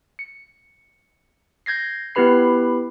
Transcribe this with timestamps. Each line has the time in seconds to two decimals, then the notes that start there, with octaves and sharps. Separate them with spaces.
0.19 C#7
1.66 G6 G#6 A#6 C7
2.15 B3 E4 G4 B4 B5 C7